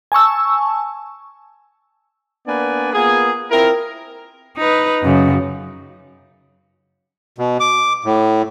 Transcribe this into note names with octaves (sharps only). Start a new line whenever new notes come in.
G#5 A5 C#6 E6
A#3 B3 D4 B4 D5 G#5
A#3 B3 F4 G#4
C4 E4 F4 A#4
D#4 B4
F#2 C#3
B2
D6
A2